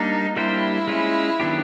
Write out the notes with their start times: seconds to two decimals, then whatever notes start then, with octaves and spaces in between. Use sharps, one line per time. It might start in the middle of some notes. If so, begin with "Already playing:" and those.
Already playing: G3 A#3 D4 D#4
0.36 G3 A#3 D4 E4 G4 C5
0.87 G#3 C#4 F4
1.40 D#3 F#3 B3 D4 G4